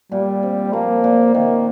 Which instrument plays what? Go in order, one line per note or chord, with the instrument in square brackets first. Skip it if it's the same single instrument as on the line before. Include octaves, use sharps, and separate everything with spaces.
[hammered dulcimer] A#2 [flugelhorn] G3
[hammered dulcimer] C4
[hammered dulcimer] F3 [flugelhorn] A#3
[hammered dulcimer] A#2
[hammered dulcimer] D#3 [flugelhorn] A#3